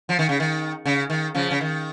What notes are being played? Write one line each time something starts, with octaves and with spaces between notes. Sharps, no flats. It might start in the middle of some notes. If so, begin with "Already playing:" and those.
F3
D#3
C#3
D#3
C#3
D#3
C#3 F3
C#3
D#3